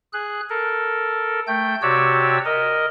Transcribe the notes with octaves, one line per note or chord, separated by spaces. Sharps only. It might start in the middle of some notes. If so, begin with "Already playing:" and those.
G#4 F#6
A4 A#4
A3 G5 G6
C3 F#4 G4 C#5 D5 E6
A#4 D#5